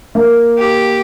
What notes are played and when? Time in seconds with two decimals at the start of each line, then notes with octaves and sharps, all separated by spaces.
0.15 A#3
0.58 G4